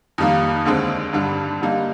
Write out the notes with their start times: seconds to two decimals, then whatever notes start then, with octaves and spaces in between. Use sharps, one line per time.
0.18 F2 D#3 G3 A#3
0.65 D#2 D3 G#3 C4
1.13 G2 D3 G3
1.61 D3 G3 A#3 D#4